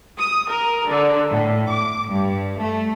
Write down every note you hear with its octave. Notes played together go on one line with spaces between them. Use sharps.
D#6
A#4
D3
A2
D6
G2
A3